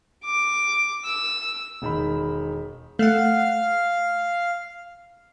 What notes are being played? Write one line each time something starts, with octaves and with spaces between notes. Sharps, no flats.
D6
E6
E1 D#3 B5
A3 F5 F#5